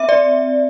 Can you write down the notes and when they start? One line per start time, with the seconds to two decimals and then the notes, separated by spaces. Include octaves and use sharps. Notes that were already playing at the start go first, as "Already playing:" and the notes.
Already playing: C4 E5
0.09 D5